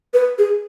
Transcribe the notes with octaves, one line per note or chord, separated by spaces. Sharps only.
B4
G#4